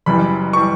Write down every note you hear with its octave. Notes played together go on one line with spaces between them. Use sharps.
F#1 F#2 E3 G3 B5
E3 G3 C#6